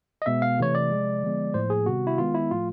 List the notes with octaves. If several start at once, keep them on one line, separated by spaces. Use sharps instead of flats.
D#5
B2 G#3 B3 E5
F5
C3 E3 A3 C#5
D5
C3 F3 G#3
D3 F3 G#3 B3
A2 F3 A#3 C5
G#4
C3 D#3 G3 B3 F#4
E4
D#3 G#3 B3 F4
E4
A2 F3 A3 F4